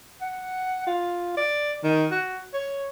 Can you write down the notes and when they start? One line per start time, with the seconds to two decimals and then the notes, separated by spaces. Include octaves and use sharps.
0.21 F#5
0.87 F4
1.37 D5
1.84 D#3
2.11 F#4
2.54 C#5